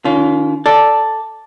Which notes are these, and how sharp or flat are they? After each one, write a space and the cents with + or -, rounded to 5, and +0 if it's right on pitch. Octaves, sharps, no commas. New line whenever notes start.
D#3 -15 C#4 +40 F4 +0
A4 +0 D5 +0